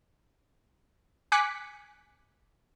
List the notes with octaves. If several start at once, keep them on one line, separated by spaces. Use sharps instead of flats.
G#5 D6 F#6 B6 C#7